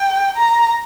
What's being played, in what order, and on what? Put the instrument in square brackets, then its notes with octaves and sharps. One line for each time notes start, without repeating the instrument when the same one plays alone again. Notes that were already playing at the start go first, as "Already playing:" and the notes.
Already playing: [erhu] G5
A#5